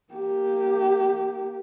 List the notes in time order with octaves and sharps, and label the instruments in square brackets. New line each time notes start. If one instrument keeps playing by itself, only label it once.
[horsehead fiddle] A#3 G4